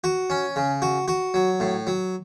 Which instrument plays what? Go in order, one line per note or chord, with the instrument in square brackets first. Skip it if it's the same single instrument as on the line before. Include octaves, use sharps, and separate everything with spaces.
[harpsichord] F#4
C#4
C#3
F#4
F#4
F#3
A2
F#3